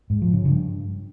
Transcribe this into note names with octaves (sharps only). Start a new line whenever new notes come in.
G#2
F3
C#3
G2